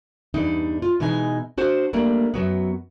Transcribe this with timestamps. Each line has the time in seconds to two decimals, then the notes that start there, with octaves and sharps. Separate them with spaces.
0.34 E2 G2 D4 D#4
0.82 F4
1.00 B2 E3 G#3 D#4 G#5
1.58 D4 F#4 C5
1.93 G3 A3 A#3 D4
2.34 F#2 F#3 B3